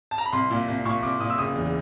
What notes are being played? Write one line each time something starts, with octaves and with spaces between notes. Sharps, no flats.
A5
A#5
B5
C2 C6
A#2
C2
A#2 C#6
C2 D6
A#2 D#6
E6
F#1 D#6
E2